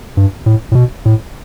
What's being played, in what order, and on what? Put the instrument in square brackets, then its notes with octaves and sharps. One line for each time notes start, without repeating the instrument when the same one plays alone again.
[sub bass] G2
A2
A2
B2
A2